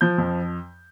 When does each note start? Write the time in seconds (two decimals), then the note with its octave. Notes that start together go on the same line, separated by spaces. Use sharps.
0.01 F3 G6
0.18 F2